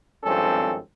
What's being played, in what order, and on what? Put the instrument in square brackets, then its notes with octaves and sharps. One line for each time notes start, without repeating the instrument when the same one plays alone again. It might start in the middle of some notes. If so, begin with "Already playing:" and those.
[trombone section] G#1 G2 F3 C4 C#4 A4